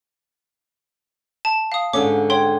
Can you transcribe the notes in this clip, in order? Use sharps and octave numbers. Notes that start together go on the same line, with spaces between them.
A5
F5 D#6
G#2 D3 C#4 D6
C#5 G5 C6